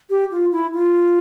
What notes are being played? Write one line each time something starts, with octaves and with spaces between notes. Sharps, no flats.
G4
F4
E4
F4